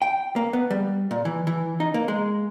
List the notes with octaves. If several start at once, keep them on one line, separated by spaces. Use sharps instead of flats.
G5
A#3
B3
G3
A#2
E3
E3
D#4
A#3
G#3